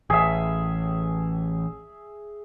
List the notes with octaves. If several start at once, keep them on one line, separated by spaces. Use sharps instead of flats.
A1 G#4 E5